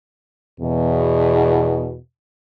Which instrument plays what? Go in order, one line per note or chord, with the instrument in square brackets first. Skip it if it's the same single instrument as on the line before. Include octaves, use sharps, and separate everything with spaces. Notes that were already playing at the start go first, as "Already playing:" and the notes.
[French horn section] E2 B2